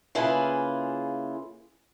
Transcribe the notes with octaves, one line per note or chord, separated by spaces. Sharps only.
C#3 A#3 E4 F4 G#4 B4